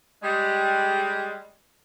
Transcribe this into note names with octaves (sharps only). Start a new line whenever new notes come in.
G3 G#3